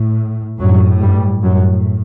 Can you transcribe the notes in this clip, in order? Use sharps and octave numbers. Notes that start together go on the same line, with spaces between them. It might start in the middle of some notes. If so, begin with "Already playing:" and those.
Already playing: A2
F#2 A2 F#3
G2 G3
F#2 A2 F#3